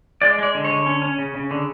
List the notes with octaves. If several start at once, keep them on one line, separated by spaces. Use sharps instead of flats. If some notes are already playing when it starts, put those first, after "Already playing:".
G#3 D5
G#3 D5
D3
C#5
D3
C#4
C#4
C#3
C#3
D3